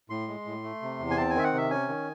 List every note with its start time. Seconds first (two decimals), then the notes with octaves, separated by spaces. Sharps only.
0.10 A2 C6
0.28 G#3
0.46 A2
0.63 A3
0.82 C3
0.99 E2
1.11 G#5
1.17 C4 A5
1.30 G#5
1.35 D#3 E5
1.43 F#5
1.53 C3 E5
1.71 C#4 G#5
1.88 D#3